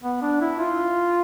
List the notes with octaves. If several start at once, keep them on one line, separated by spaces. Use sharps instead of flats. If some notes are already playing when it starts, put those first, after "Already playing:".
B3
D4
E4
F4